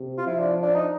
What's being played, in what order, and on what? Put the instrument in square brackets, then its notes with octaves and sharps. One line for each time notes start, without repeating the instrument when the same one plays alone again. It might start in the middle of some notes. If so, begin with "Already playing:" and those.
Already playing: [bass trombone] C3
[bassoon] F4
[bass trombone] F3 [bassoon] E4
[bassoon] D4
D4
D#4